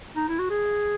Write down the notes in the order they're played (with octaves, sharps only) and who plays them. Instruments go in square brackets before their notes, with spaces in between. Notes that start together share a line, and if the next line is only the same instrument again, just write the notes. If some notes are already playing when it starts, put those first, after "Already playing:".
[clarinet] D#4
E4
F#4
G#4